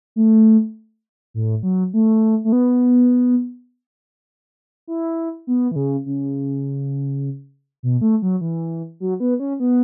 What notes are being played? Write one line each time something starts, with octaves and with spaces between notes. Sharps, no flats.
A3
A2
F#3
A3
A3
B3
E4
B3
E3
C#3
C#3
B2
A3
F#3
E3
F#3
B3
C#4
B3